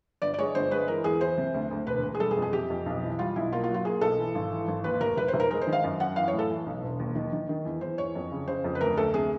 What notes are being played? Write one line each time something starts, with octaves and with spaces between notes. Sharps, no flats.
G1 D5
D5
G#3 C#5
G1 C5
G#3 B4
E3 A#4
E2 G#4
E3 C5
C3
D2
D2
E1 B4
E1
G#4
G3 A4
G#4
F2
G#4
C3 G4
F2
B1
E3
G3 F4
B1 E4
A#3 F4
F4
F#3
F4
A#3 G#4
B1 A4
E3
G#1
E3
G#1
D#2 B4
F1 A#4
F1 B4
C5
F1
A#4
G#3 A#4
C5
D#3
F5
F#2
F#2 F#5
E3 F5
C#5
A2
A4
E3
B1
E1
D#2
D#3
D#3
D#3
E2
E2 C5
E2 C#5
F2
C#3
C#3 C5
F2
B4
D2 A#4
D2 A4
C3 G#4